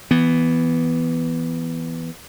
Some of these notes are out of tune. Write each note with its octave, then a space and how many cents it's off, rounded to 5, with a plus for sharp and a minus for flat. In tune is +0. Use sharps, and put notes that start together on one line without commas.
E3 +0 B3 +0